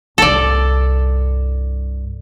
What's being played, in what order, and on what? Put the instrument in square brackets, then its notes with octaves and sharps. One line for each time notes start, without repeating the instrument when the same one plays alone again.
[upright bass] C2 G2 [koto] A4 D5